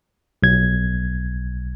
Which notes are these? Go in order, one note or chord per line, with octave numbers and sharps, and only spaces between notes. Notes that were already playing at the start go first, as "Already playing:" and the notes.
B1 G#6